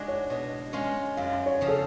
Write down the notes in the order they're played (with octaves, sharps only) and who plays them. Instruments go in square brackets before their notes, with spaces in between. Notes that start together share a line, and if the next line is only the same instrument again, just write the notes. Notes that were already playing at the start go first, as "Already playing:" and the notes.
Already playing: [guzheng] G#3 D4 F#4 [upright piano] D5
[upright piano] C#5
[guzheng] B2
G#3 C#4 F4
[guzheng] F#2 [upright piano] F5
[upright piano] C#5
[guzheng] C#3 F3
[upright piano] A4